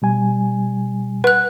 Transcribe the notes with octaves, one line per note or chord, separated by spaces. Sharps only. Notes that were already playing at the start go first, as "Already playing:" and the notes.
B2 G3 G#5
B4 F#5 F#6